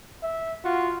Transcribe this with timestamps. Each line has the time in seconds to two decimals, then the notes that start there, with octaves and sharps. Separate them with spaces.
0.23 E5
0.65 F4 F#4